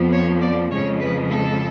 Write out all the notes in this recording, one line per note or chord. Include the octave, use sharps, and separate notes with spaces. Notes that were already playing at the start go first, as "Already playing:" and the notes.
Already playing: F2 F3 B3
C#5
D5
F2 C#3 F3 G#3 C#5
B4
A4